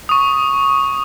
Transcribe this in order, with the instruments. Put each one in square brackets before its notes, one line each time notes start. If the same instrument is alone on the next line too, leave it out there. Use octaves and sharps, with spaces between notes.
[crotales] C#6 D#6